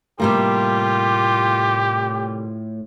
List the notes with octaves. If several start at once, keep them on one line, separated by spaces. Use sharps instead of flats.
A2 C3 G3 A#3 F4 G4